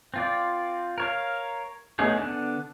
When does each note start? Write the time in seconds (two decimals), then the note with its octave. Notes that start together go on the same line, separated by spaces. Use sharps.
0.14 C4 F4 D5
0.98 A#4 C#5 F5
1.99 A3 B3 C#4 D#4 G#4
2.17 D3 B3 D4